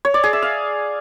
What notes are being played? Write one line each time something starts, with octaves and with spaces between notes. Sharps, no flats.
C#5
D5
G#4
E5
F5